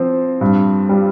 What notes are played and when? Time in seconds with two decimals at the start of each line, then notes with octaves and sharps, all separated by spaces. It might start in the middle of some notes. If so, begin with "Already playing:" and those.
Already playing: F3 C4
0.41 G2
0.89 G3